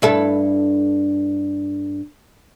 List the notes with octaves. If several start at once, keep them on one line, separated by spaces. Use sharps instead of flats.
G2 E4 A4